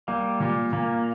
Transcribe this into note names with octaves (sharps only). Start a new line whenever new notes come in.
G3 A#3
A#2
A#2 A#3